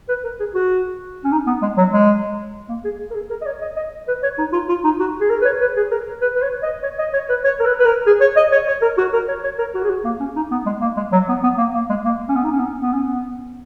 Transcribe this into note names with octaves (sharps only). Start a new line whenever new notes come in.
B4
A#4
G#4
F#4
C#4
D#4
B3
G#3
F#3
G#3
A#3
G#4
A#4
G#4
A#4
D#5
C#5
D#5
D#5
B4
C#5
D#4
F4
F4
D#4
F#4
G#4
A#4
B4
C#5
B4
G#4
A#4
B4
B4
C#5
D#5
C#5
D#5
C#5
B4
C#5
A#4
B4
B4
A#4
G#4
C#5
D#5
C#5
C#5
A#4
F#4
A#4
C#5
C#5
A#4
F#4
G#4
F#4
A#3
C#4
D#4
B3
G#3
A#3
G#3
F#3
B3
B3
A#3
A#3
G#3
A#3
C#4
B3
D#4
C#4
B3
C#4
B3
C#4
B3